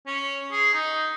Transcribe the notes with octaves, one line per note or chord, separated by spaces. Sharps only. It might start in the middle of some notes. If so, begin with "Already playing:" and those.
C#4
G#4
D#4